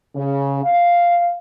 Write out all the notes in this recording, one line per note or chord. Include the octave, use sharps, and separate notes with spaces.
C#3
F5